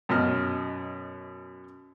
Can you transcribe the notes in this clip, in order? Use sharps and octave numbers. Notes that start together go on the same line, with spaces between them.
F#2 B2 D#5 F6